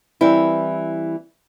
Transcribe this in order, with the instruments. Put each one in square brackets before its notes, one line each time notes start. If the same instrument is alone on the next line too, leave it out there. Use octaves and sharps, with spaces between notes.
[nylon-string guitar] E3 G3 C4 E4